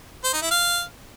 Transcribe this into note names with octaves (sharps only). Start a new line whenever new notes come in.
C5
D#4
E4
F5